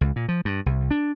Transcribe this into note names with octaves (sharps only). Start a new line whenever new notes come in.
C#2
A#2
F3
G2
C2
D4